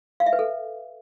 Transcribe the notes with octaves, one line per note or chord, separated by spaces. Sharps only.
F5
E5
B4
A4